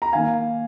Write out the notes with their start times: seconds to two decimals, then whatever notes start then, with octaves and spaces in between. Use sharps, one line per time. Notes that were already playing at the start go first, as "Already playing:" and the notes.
0.02 A#5
0.13 D#3 A#3 F5 G#5